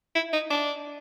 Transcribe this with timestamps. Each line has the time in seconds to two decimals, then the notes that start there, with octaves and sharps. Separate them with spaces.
0.15 E4
0.33 D#4
0.50 D4